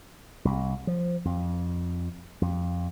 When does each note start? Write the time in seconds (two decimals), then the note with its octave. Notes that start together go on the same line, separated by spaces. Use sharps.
0.45 C2
0.87 F3
1.25 F2
2.41 F2